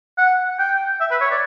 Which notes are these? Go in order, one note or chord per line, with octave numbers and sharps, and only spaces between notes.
F#5
G5
E5
B4
C#5
D5